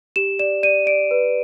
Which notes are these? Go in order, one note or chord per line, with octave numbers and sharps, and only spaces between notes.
G4 E7
D5 E7
D5 D#7
D5 D7
B4